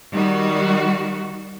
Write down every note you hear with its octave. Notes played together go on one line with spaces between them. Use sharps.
D#3 G3 F#4